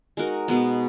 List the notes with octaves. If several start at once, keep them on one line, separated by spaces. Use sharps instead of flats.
G#3 D#4 F#4 A#4
B2 G#3 B3